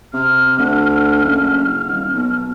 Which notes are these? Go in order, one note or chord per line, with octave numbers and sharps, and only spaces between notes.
C3 F6
D2
F#1
D#1
B1